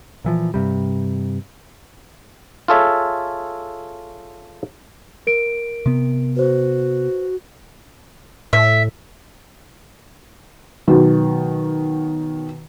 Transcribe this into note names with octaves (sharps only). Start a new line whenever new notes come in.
A#2 E3 F3
G2 C3 G3
F4 G#4 A4 C#5 E5
A#4 D7
C3 B3
F#4 B4 C5
A2 E5
B2 D#3 F#3